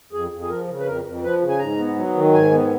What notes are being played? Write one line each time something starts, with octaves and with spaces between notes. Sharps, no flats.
F2 G#4
F2
G#4
F3 A#4
C#3
B4
F2 A#4
F2
F3 B4
C#3
G#5
G#2 A#5
B3
F#3
D#3
G#2 G#5
B3